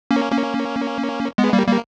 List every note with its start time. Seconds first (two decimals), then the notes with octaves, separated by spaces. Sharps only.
0.11 A#3 C#4
0.32 A#3 C#4
1.38 G#3 B3
1.53 G3 A#3
1.67 G3 A#3